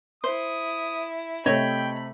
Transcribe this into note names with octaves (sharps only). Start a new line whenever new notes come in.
E4 C5 D#6
C3 A3 C#5 D#5 G5 B5